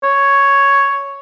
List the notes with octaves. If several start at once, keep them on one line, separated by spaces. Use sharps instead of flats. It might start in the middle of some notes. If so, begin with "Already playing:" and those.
C#5